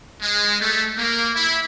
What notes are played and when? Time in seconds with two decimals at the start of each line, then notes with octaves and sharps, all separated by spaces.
0.22 G#3
0.61 A3
0.99 A#3
1.35 E4